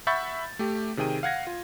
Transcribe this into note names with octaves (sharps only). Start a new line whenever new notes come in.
E5 F#5 B5 C#6 G6 A6
A3 G4
C3 D#3 G#4 G5 D#7
F5 F#5 G#6 A#6
F4